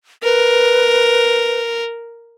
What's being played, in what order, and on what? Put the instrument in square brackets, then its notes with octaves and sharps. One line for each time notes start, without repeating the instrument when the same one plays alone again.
[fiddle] A#4 [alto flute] B4